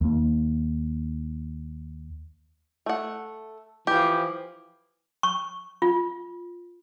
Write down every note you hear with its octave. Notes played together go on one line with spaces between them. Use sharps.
D#2 A#3
A3 F#5
E3 F3 G4 D6
C#6
F4